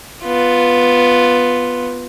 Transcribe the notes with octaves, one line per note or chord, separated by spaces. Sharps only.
B3 F4